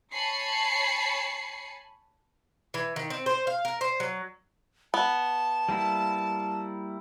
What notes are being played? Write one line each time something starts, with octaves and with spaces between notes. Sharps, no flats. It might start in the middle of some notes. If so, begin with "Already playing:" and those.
C#5 G#5 A5 B5 C7 C#7
E3
D#3
C4
C5
F5
A#4
C5
F#3
B3 A5
G3 A#3 E4